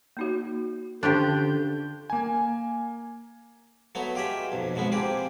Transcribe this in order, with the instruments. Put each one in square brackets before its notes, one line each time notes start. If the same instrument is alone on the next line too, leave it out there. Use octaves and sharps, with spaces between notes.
[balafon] A#3 D#4 F#4
[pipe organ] D3 [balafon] C#4 C5 C#6 [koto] D4 F4 G4 [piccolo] G6
[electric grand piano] A#3 G#5
[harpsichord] F#3 A3 B3 A#5
F4 G4 G#4 D#5 E5
B1 F2
C#2 B2 F3 G#3 B3
A#3 C4 G4 G#4